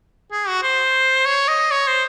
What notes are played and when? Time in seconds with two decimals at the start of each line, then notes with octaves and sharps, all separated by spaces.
0.32 G#4
0.48 F#4
0.63 C5
1.26 C#5
1.48 D#5
1.72 C#5
1.88 C5